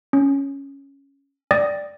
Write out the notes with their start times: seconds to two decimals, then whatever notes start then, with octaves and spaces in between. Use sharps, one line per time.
0.13 C#4
1.51 D5 G5 D#6 A6 A#6